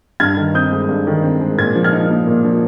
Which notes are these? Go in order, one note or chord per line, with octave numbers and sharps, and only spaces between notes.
G2 F6 G#6
D#3
C4 D#6 G6
G#3
G2
D#3
C4
G#3
A#2 G#6
F3
F6 G#6
D#4
A#3
A#2
F3